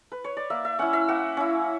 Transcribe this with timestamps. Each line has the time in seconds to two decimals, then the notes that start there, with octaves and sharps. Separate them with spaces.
0.12 B4
0.24 C#5
0.37 D5
0.50 A#3 E5
0.65 E5
0.79 C#4 E4 F#5
0.93 E5
1.08 A#3 F#5
1.37 C#4 E4